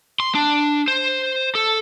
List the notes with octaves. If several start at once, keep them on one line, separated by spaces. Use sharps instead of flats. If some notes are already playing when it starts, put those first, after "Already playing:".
C6
D4
C5
A4